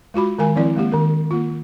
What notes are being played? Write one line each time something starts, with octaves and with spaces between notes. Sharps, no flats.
G#3 F4 F#4 B5
D#3 G#3 A#4 G#5
F3 C4 E4 D5
G#3 A#3 G4
D#3 A#4
A#3 F4